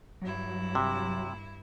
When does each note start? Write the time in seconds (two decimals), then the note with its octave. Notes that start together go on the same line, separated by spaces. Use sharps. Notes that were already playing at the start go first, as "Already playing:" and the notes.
0.21 G2 F#3 E4
0.75 C3